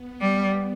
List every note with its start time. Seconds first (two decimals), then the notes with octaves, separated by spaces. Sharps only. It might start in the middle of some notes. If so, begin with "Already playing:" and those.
Already playing: B3
0.21 G3